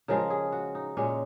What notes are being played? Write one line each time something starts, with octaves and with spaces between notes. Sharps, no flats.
C#3 F3 G#3 A#4
G#4
F#4
D#4
A#2 G#3 C#4